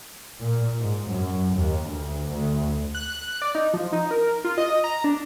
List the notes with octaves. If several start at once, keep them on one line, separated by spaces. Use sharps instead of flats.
A#2
G#2
F#2
D#2
D2
D2
F#6
D5
D#4
F3
D#4
A#4
F4
D#5
A#5
D4